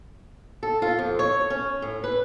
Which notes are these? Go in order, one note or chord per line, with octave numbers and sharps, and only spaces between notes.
A4
F4
F2
C#5
C#4
A2
B4